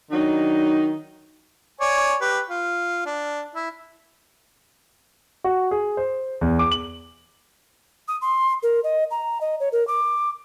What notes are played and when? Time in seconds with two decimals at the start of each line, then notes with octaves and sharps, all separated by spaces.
0.11 D#3 F#3 D4 D#4
1.80 C#5 D5 G#5
2.21 G4 B4
2.50 F4
3.06 D4
3.55 E4
5.44 F#4
5.71 G#4
5.97 C5
6.41 E2
6.59 D6
6.71 F#7
8.08 D#6
8.22 C6
8.63 A#4
8.84 D#5
9.11 A#5
9.41 D#5
9.60 C#5
9.72 A#4
9.88 D6